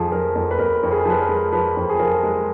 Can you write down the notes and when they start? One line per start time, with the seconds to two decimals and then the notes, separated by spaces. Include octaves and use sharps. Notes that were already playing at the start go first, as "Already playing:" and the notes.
Already playing: F2 F3 G#4
0.12 F3 A#4
0.35 F2
0.51 B4
0.59 F2 A#4
0.83 F2
0.91 G#4
1.05 F3 B4
1.22 A#4
1.29 G#3
1.52 F3 B4
1.77 F2
1.89 G#4
2.00 F3 A#4
2.23 G#3